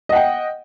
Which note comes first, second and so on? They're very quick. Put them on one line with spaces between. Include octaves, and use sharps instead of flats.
D#5 F#5 G5